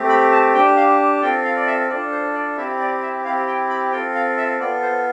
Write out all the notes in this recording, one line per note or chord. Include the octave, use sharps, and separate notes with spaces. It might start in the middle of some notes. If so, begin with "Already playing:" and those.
Already playing: A3 C4 G4
B5
A5
D4 G4 G5
F5
C4 F4 A4 G5
F5
D5
E5
D4 F4 A4 D5
C5
D5
C4 E4 G4 E5
D5
E5
C4 E4 G4 F5
G5
B5
C4 F4 A4 G5
F5
E5
B3 F4 A4 D5
C5